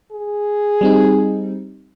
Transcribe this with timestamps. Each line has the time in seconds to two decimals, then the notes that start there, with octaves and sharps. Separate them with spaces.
0.12 G#4
0.81 G3 C4 D#4